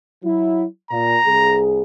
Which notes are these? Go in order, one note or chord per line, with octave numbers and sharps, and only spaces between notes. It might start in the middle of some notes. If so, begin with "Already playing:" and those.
F#3 E4
A#2 A#5
C2 G#4